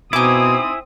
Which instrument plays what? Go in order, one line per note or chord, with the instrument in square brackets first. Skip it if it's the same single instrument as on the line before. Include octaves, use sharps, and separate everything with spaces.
[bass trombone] B2 [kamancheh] C4 D#6 [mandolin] D#4 D6 [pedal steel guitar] E4 G#5